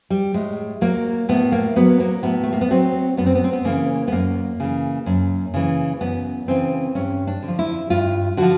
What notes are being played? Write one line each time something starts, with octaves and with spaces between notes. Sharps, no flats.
G3
A2 G#3
F#3 A#3
A2 B3
A#3
F#3 B3
A#3
A2 B3
A3
A#3
B3
F#3 C4
F#2 B3
C4
B3
C4
B3
C#3 E3 A#3
B3
F#2 A#3
C#3 E3
F#2
C#3 E3
F#2 B3
C#3 E3 C4
G2 C#4
D4
D3
F3
E4
G2 F4
D3 F3 F#4